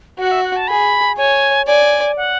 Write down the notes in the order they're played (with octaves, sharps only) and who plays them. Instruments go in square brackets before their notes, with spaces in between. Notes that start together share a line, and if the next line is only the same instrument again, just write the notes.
[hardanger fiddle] F#4 [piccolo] F#5
[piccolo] E5
F#5
A5
[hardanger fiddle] G#4 [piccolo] B5
[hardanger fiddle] C#5 [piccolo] G#5
[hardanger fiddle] D5 [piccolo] G#5
[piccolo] F#5